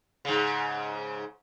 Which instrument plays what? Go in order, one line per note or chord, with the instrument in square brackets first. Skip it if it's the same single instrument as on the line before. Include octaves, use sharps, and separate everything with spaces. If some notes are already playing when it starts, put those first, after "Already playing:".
[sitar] G#2 C#3